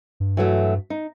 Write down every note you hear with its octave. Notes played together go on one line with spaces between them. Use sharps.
G2
E3 F#3 A3
D#4